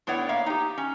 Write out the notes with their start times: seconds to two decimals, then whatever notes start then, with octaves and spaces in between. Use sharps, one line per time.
0.07 A2 B3 D4 C#5 F#5
0.29 A#3 E5 F5
0.46 D#4 G4
0.78 C#4